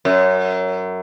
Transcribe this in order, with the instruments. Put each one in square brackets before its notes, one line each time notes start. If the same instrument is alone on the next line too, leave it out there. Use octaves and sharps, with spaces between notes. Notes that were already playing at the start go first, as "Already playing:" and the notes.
[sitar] F#2